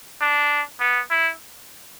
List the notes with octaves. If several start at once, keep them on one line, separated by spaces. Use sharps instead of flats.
D4
B3
E4